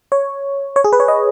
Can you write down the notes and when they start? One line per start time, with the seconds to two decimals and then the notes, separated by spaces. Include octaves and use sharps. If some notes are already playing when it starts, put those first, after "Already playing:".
0.12 C#5
0.76 C#5
0.84 G#4
0.93 B4
1.00 C#5
1.08 D#5